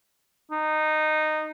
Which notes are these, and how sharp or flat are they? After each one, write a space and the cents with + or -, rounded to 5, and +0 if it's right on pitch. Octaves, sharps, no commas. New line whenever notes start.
D#4 -15